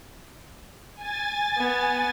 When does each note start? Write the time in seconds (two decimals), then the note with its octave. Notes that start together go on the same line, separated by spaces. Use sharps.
0.95 G#5 A6
1.57 B3